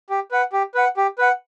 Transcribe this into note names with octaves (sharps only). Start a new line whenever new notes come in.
G4
B4 F#5
G4
B4 F#5
G4
B4 F#5